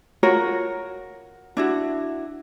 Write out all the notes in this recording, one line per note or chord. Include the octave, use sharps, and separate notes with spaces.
F4 F#4 A#4 C#5
D4 E4 F#4